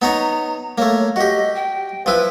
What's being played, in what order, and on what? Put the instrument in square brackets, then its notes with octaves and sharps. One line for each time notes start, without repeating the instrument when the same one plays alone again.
[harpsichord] B3 D#4 C#5 [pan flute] A#5
[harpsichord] A3 A#3 [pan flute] C#5
[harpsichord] F#4 G4 [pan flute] D#5
[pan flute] G5
[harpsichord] F3 E4 [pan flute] B4